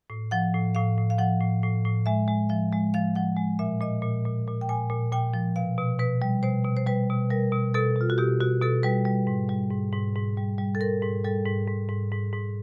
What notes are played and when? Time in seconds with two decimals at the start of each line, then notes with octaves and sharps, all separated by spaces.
0.10 A2
0.31 F3 F#5
0.54 A2
0.75 A2 F5
0.98 A2
1.10 F5
1.18 F3 F#5
1.41 A2
1.63 A2
1.85 A2
2.06 G#3 E5
2.28 G#3
2.49 F3 E5
2.72 G#3
2.94 F3 F5
3.16 F3 F#5
3.37 G#3
3.59 A#2 E5
3.81 A#2 D#5
4.02 A#2
4.25 A#2
4.47 A#2
4.61 G5
4.69 A#2 G#5
4.90 A#2
5.12 A#2 G5
5.34 F3
5.56 B2 F5
5.78 B2
5.99 B2 B4
6.22 G3
6.43 B2 C5
6.65 B2
6.77 C5
6.87 G3 B4
7.10 B2
7.30 G3 A#4
7.52 B2
7.74 B2 A4
7.96 B2 F4
8.10 F#4
8.18 B2 G4
8.41 B2 F#4
8.62 B2 A4
8.83 G3 B4
9.05 G3
9.27 G#2
9.49 G3
9.71 G#2
9.92 G#2
10.16 G#2
10.37 G3
10.58 G3
10.75 A4
10.80 G#2 A#4
11.03 G#2
11.25 G3 A4
11.46 G#2
11.68 G#2
11.89 G#2
12.12 G#2
12.33 G#2